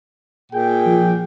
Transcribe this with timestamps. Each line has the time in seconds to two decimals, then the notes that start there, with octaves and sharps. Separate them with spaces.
0.52 A#2 G#4 G5
0.86 F3